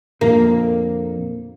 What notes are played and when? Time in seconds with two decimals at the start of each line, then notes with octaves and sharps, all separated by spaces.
0.21 F2 A#2 D3 A#3